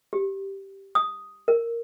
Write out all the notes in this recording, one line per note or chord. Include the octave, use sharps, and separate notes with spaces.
G4
D#6
A#4